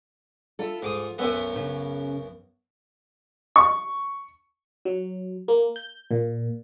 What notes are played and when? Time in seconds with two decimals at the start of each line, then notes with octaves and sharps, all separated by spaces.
0.59 E4 F4 A4
0.82 G#2 F4 D6 D#6
1.18 B1 F#2 B3 B4 E5 G#5
1.53 C#3 C#4
3.56 C#6
4.85 F#3
5.48 A#3
5.76 G6
6.11 A#2